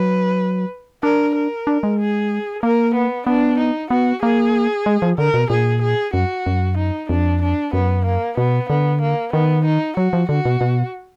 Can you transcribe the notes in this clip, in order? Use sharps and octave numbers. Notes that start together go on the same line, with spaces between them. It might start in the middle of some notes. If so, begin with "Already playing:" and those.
Already playing: F#3 B4
D4 A#4
A#4
D4
G#3
G#4
A#3 A#4
B3
B3 D4
D#4
B3 F#4
A#3 G#4
G#3
F3
D3 A#4
B2
A#2 G#4
G#4
F#2 F#4
F#2
D#4
F2 D4
D4
F#2 B3
A#3
B2 B3
D3 B3
A#3
D#3 B3
D#4
F#3 F#4
F3
D3 F#4
B2
B2